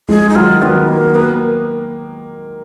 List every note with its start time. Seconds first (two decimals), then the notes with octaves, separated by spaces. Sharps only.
0.09 F3 G#3 G#4
0.29 D#4
0.35 D#3 F#3 F4
0.62 D#3 F#3 B3
0.88 A#3
1.15 A#3 B3